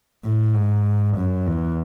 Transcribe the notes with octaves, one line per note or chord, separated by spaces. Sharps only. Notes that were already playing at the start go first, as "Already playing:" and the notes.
A2
G#2
F#2
E2